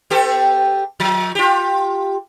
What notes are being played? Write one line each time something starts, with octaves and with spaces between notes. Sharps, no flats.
B3 G4 A4
F3
F4 G4